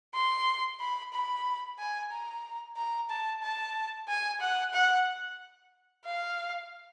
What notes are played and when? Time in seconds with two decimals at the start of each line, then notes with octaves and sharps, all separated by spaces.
0.14 C6
0.80 B5
1.13 B5
1.79 G#5
2.11 A#5
2.77 A#5
3.10 A5
3.42 A5
4.08 G#5
4.41 F#5
4.73 F#5
6.05 F5